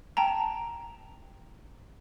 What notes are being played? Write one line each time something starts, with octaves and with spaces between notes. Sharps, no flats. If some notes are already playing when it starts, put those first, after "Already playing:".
G5 A5 A#5